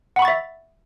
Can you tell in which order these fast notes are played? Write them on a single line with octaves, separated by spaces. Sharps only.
F#5 B5 C#6 A6 E5